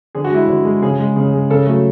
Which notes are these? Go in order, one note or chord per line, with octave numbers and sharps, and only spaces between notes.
D3 G#4
F#4
G#3 E4
D3 F#4
G#3
C#3 G#4
G#3
C#3
G#3
C#3 A4
F#3 A3